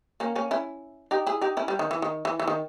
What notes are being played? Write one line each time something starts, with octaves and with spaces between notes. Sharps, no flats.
A#3 C#4
A#3 C#4
C#4 E4
D#4 G4
E4 G#4
D#4 G4
C#4 E4
G3
D#3
E3
D#3
E3
E3
D#3